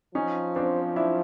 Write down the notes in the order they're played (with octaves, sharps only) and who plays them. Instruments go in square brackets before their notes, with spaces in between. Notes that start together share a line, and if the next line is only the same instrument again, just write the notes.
[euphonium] F3 [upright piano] C#4 D#4
[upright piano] C4 D4
D4 E4